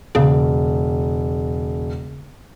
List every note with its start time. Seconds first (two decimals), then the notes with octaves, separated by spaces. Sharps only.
0.15 E1 C#3